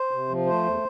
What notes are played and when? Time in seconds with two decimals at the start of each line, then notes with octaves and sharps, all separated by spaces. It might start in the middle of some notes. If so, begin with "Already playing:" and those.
Already playing: C5
0.11 C3
0.29 F3
0.46 A3 C5
0.64 E2